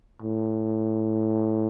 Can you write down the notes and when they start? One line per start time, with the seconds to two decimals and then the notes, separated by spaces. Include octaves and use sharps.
0.22 A2